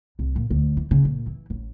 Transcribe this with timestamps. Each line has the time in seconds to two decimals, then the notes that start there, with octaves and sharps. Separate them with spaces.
0.19 C2
0.36 A#2
0.50 D2
0.77 E3
0.91 C#3
1.05 A#2
1.27 E3
1.50 A1